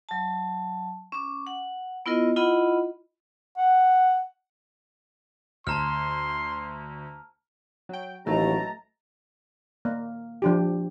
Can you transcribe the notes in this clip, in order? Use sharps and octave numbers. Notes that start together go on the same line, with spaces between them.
F#3 A5
C#4 D6
F#5
B3 E4 F4 A#4 D#5
E4 F4 D#5 F#5 B5
F#5
D2 A5 A#5 C6 F6
F#3 G5
A1 D#2 B2 F#3 A3 A5 A#5
A#3
F3 D4 G4